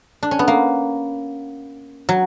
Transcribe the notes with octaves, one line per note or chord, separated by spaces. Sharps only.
D4
C#4
B3
A#3
F#3